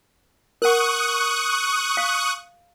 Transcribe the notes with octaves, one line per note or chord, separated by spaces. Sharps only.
A#4 F#5 C#6 D#6 F#6
F5